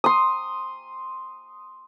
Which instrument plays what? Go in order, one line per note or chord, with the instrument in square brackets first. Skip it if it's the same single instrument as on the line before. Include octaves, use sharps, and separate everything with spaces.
[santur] C6 D#6